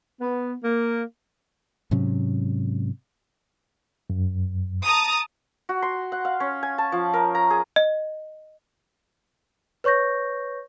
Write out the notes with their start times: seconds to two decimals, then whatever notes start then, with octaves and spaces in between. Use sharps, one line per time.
0.21 B3
0.64 A#3
1.91 G#2 C3 F#3 C#4
4.10 F#2
4.84 A5 A#5 D#6
5.69 F#4
5.82 C6
6.12 F#5
6.25 F5
6.40 C#4
6.63 G#5
6.78 A5
6.92 F3
7.14 A#4
7.35 A#5
7.50 G#4
7.76 D#5
9.84 B4 C#5 C#6 G6 A#6